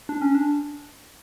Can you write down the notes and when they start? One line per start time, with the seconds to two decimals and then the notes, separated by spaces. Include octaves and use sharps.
0.09 D4
0.21 C#4
0.35 D4